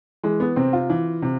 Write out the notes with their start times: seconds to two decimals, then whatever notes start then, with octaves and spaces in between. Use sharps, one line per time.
0.24 E3 G#3
0.40 B3
0.56 C3 C4
0.73 F4
0.90 E3
1.22 C3